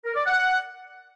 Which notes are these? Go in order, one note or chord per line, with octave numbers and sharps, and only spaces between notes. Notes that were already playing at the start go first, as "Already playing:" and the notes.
A#4
D5
F#5